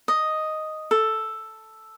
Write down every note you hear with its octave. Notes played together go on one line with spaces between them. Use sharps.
D#5
A4